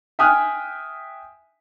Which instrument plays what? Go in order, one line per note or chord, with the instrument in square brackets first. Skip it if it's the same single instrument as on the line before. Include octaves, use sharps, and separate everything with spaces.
[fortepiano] E5 G5 G#5 D#6 F6 F#6